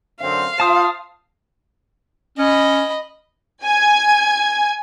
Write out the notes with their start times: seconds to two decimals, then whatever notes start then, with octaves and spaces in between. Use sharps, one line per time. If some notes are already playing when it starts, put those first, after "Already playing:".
0.22 F#2 D3 C4 F5
0.60 F4 C5 A5 D#6
2.38 C#4 D#5 B5
3.63 G#5 G#6